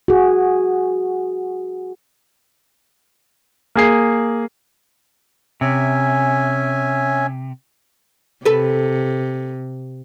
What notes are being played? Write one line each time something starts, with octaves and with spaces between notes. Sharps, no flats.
F#4 G#4
A#3 G#4 C7
C3 C#4 E5 G#5
C3 A4 B4